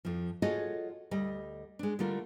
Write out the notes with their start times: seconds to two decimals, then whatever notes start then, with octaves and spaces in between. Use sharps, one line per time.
0.05 F2 F3
0.42 F4 F#4 G#4 A4 C#5 D#5
1.11 D2 G3 D#5
1.79 G#3 D4
1.99 D3 G3 A3 F4 A#4